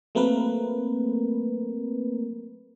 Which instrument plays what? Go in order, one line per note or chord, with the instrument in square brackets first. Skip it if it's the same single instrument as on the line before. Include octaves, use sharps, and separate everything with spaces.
[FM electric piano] F#3 A3 A#3 C4 A#4 B4